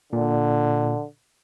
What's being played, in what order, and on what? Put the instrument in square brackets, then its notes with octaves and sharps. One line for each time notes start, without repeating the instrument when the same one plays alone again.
[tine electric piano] A#2 [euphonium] D3